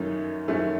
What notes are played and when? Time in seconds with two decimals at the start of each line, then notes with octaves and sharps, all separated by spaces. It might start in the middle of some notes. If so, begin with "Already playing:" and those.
Already playing: F#2 D#3 F#3 A3 C#4
0.48 F#2 D#3 F#3 A3 C#4